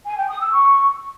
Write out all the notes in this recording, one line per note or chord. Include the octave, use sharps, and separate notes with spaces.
G#5
G5
D#6
E6
C#6